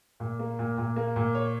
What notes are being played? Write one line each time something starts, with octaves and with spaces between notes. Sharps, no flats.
A#2
A#3
A#2
A#2
A#3
A#2
C#5